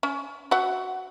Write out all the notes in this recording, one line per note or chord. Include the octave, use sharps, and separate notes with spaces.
C#4
F#4 E5 F#5